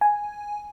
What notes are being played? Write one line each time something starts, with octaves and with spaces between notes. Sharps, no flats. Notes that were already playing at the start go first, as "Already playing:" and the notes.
G#5